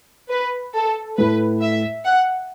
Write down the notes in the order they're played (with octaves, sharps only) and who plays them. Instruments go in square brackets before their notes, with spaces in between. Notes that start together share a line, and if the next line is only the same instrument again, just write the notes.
[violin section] B4
A4
[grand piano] A2 A3 E4 [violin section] B4
[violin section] E5
F#5